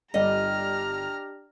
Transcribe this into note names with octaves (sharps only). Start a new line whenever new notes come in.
G1 G3 D4 G4 D#5 A#5 F6